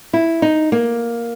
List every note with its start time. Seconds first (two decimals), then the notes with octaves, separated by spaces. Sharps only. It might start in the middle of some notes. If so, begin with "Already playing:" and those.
0.13 E4
0.42 D#4
0.72 A#3